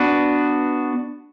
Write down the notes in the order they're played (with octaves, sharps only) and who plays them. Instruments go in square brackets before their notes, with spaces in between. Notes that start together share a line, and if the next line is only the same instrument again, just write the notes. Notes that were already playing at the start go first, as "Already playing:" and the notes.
Already playing: [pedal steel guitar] B3 D4 F#4 B4